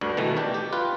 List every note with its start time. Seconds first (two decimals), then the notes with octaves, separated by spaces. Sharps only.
0.01 D2 G2 D3
0.17 B2 D#3 E3 A3
0.37 D4 G4
0.54 G4
0.73 F4 B4